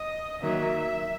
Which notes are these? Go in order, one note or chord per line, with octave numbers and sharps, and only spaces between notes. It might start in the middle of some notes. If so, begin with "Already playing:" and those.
Already playing: D#5
D#3 F#3 A#3 E5